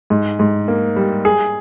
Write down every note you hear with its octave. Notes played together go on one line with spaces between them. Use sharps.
G#2
G#2
A#3
G3
G#4